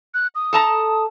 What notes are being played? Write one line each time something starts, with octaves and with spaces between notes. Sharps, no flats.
F#6
D#6
A4 A5 A#5